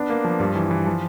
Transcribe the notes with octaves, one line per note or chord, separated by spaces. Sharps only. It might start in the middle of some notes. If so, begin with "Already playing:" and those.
Already playing: B3 D4
A#3
F3
G2
E3
E3
F3